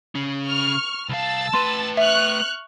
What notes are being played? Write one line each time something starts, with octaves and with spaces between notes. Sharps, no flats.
C#3 C#4
C#6 F6
C2 F5 A5 E6 A6
A3 B4 C6
E5 C#6 F6 F#6